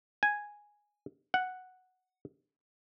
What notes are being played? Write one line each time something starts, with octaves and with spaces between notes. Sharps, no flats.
G#5
F#5